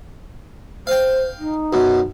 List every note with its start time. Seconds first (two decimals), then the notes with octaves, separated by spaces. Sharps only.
0.87 C5 F5 G5
1.39 D#4
1.73 F#2 B2